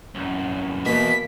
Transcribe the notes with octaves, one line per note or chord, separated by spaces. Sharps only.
C2 F#2
E2 G#2 B2 A#3 B6